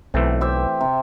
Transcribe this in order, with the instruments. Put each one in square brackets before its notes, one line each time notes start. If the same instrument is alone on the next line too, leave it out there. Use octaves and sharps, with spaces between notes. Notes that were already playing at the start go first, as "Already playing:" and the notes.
[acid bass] B1 [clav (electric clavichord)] E3 A3 C4
[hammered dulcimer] G4 C5 E5
C3